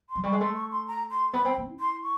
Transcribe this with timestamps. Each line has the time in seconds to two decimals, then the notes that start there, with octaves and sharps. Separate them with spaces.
0.09 C6
0.15 F#3
0.23 G3 C#6
0.32 G#3
0.40 A3 C6
0.55 C#6
0.71 C6
0.87 A#5
1.10 C6
1.33 B3 B5
1.45 C4
1.57 A#3
1.69 E4
1.80 C6
2.03 C#6